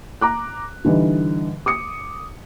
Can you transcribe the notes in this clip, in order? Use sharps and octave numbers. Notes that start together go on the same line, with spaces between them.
A#5 D6 F#6
D3 E3 G3 D#4
D6 D#6 C#7